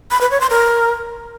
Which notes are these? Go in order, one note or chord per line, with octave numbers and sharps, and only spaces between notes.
B5
B4
C#5
C6
A#4